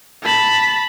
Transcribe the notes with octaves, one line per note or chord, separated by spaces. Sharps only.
A5 B5